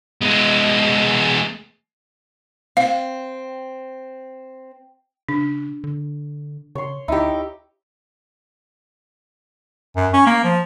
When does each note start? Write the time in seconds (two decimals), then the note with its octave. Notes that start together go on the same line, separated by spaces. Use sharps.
0.22 G#3 B3
2.77 C4 F5
5.29 C#3 D4
5.84 D3
6.75 C#3 C#5 C6
7.08 D2 D#4 E4 G4
9.96 F#2
10.13 C#4
10.26 A#3
10.44 F3